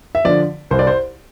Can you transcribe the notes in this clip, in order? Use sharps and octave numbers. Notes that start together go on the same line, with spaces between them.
E5
D3 F3 D5
C2 C5
D5
C5